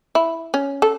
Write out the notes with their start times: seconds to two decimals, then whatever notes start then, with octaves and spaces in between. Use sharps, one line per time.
0.15 E4
0.54 C#4
0.82 A4